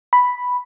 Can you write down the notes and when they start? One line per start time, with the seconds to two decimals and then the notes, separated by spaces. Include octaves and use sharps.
0.13 B5